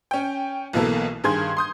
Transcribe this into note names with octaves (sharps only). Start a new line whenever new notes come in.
C#4 G5
B1 B2 E3 A#3 A4
G2 D#3 G#4 C6 G#6
C6 D#6 G6